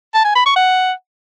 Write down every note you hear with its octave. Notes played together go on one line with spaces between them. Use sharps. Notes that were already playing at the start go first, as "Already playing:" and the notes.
A5
G#5
B5
C#6
F#5